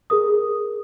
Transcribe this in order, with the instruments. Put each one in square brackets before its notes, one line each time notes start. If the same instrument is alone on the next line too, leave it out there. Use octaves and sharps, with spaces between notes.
[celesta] G#4 A#4 D#6